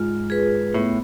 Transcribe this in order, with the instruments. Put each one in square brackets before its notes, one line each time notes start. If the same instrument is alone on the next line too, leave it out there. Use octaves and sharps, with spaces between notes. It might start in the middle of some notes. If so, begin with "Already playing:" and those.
Already playing: [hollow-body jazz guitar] G#2 [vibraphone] F4
[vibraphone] G#4 B4
[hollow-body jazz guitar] A2 [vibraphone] B3